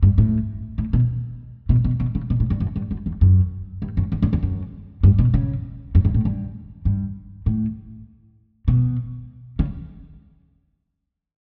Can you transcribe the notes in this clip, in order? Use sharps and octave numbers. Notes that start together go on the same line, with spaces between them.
G2
A2
A2
B2
B2
B2
B2
C#3
B2
A2
G2
F#2
G2
F#2
E2
F#2
G2
F#2
E2
F#2
E2
F#2
G2
B2
C#3
F#2
G2
A2
G2
G2
A2
B2
C#3